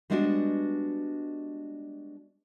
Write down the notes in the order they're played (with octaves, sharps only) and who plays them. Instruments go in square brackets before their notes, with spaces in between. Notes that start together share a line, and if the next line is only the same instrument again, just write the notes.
[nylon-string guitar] G3 G#3 B3 D4 D#4 F#4